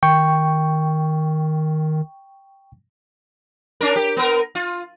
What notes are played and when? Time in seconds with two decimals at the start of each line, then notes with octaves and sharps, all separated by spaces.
0.03 D#3 G5 C#6
3.81 C#4 D4 A#4
3.96 G4
4.17 B3 A#4
4.55 F4